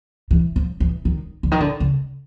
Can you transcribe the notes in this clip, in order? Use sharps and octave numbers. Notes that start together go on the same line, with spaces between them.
E3
F3
E3
D#3
D3
D#3
D3
C#3